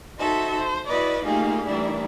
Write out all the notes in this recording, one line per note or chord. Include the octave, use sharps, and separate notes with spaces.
D#4 F#4 A4 C5 E5
C5
E4 F#4 B4 D5 D#5
A3 A#3 D#4 F4 G4 G#4
D#3 E3 G3 A3 D4 E4